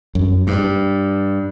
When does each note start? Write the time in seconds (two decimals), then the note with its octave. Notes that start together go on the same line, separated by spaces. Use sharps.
0.15 F#2
0.47 G2